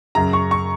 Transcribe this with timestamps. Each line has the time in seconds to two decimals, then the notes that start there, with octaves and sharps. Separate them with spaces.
0.15 F#2 C#3 A#5
0.33 C#6
0.51 C#6